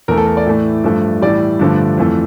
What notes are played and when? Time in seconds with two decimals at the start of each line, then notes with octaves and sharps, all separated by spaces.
0.08 E2 E3 A3 A#4
0.17 A4
0.26 A#4
0.37 D5
0.46 A2 E3 A3
0.84 G2 F3 A3
1.21 A2 E3 G3 D5
1.59 G2 D3 F3 A3
1.97 F2 E3 A3